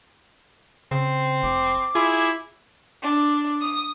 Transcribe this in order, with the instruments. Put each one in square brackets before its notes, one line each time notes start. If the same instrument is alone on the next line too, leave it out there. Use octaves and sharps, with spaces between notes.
[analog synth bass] C#3 [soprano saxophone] C4
[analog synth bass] F1 [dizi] D6
[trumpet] E4 [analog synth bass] F4 [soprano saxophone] G#4
[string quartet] D4
D#6